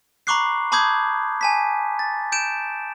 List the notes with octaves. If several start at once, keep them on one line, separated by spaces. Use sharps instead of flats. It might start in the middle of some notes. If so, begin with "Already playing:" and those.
A#5 B5 C#6 D6 F#6 C7
A5 B5 D6 D#6 G6 G#6
G#5 A5 B6
A6
G6 D7 E7